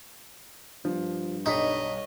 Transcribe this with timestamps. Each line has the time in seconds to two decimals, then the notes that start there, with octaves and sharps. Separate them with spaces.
0.85 G2 F3
1.46 B1 G3 D#4 C#5 D#5 B6